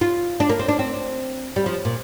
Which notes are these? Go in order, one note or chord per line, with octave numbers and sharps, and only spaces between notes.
F4
D4
A#3
C4
D4
C4
G3
F3
A#2